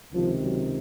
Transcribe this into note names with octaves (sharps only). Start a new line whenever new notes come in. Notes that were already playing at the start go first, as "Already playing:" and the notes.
C#2 C3 D#3 F3
F#3